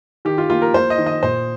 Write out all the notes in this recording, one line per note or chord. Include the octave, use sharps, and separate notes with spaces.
D#3 G4
F4
A#3 F4
A#4
A#3 C5
D#5
D#3
D#5
A#2 C5